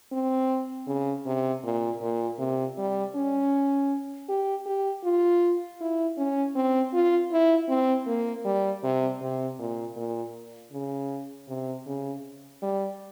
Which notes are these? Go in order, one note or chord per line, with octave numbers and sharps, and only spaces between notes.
C4
C#3
C3
A#2
A#2
C3
G3
C#4
G4
G4
F4
E4
C#4
C4
F4
E4
C4
A#3
G3
C3
C3
A#2
A#2
C#3
C3
C#3
G3